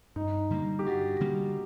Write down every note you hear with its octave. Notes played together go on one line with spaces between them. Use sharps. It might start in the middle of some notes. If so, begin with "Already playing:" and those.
G2 D#4
D3 G3 A#3
G4
G2 F#4
D3 G3 A#3